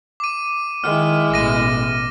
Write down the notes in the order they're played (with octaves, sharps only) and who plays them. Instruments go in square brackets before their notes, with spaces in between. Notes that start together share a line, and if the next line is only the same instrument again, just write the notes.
[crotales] D6 D#7
[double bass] D#3 [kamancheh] G#3 E4 [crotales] F6
[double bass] A1 B2 [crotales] D6 A#6 D#7